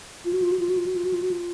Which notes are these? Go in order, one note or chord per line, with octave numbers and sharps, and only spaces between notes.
F4
F#4
F4
F#4
F4
F#4
F4
F#4
F4
F#4
F4
F#4
F4